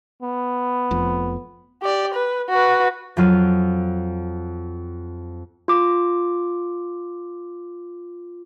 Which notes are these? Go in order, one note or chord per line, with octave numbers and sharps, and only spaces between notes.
B3
F1 F2
G4 D5
B4
F#4 B4
F2 F#3 F4 F6 D#7
F4 D6